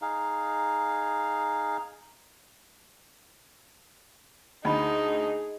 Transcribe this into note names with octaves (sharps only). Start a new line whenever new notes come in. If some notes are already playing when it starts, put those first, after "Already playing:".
D#4 G#4 F5
D2 D#4 G#4 D#5 B5